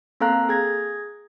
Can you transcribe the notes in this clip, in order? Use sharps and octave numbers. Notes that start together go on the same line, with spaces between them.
A#3 C4 A4 F5 A#5 F#6
G#4 G#6 A#6